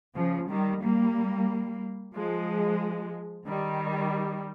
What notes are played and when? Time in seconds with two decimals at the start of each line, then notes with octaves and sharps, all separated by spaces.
0.15 C#3 F3
0.49 D#3 G3
0.82 G3 A#3
2.15 F3 G#3
3.48 D#3 G3